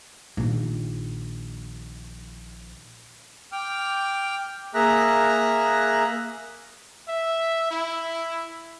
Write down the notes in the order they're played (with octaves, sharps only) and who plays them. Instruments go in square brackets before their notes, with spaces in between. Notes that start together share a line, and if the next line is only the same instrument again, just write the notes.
[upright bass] A#1 D#3
[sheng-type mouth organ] G5 D6 F6
A#3 G#4 E5 A#5 F#6
[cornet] E5
E4